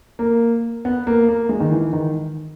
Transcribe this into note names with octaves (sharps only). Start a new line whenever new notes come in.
A#3
B3
A#3
A#3
G#3
D#3
E3
D#3